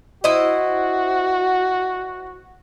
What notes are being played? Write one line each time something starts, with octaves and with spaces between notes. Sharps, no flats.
E4 F#4 C5 D#5